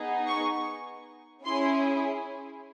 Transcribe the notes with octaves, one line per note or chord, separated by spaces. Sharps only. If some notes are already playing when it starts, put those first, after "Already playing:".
Already playing: B3 D#4 G#4
C#6
C#4 E4 G#4 C6